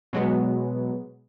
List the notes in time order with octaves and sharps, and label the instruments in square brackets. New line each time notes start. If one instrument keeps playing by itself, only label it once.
[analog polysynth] B2 F#3 G#3 B3